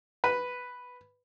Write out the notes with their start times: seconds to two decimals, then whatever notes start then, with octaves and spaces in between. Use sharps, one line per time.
0.24 B4